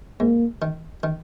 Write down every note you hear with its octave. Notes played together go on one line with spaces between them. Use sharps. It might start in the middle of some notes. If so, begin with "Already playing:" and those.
G#2 A#3
D#3
D#3